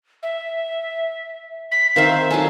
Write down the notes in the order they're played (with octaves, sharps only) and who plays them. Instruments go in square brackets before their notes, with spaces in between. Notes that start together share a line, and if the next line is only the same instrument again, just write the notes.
[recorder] E5
B6
[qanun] D#3 C4 E5 [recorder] F5
[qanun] F#3 D#4 A4 [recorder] G#5